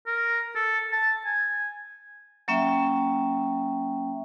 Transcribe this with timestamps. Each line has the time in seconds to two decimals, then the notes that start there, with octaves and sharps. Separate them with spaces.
0.07 A#4
0.55 A4
0.93 A5
1.26 G#5
2.48 F#3 A#3 C#4 E5 G5